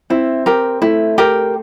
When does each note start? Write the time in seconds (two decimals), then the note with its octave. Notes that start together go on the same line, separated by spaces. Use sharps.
0.10 C4 E4
0.46 G4 A#4
0.82 A3 E4
1.18 G4 A#4